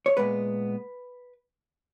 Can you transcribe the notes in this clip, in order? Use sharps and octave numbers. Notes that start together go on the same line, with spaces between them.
C#5
A#2 G#3 B3 B4